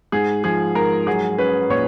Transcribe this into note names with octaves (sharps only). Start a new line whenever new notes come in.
G#2 G#4
F3 G#4
G#2 A#4
F#3 G#4
C#4 B4
A#2 C#5